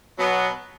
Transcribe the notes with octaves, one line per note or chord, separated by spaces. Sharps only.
B2 F#3 B3